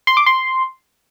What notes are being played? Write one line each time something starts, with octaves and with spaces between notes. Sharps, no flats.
C6
D6
C6